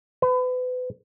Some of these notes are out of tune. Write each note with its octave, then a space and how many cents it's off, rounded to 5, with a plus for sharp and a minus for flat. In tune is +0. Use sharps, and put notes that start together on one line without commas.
B4 +35